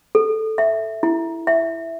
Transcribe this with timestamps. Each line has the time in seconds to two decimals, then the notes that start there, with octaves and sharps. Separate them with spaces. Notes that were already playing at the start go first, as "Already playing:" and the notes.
0.15 A4
0.58 E5
1.03 E4
1.47 E5